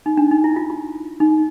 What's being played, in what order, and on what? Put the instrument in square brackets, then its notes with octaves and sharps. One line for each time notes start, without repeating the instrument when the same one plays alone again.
[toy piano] D#4
D4
D#4
E4
F4
F4
D#4